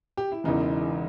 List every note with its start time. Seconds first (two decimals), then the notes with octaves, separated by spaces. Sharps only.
0.17 G4
0.32 E4
0.44 E1 E2 C#3 E3 D#4